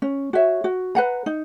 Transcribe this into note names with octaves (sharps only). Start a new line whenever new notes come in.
C#4
F#4 C#5 E5
F#4
B4 F#5 A#5
D#4